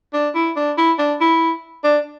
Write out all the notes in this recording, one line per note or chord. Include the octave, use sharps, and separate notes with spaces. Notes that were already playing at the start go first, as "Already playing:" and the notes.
D4
E4
D4
E4
D4
E4
D4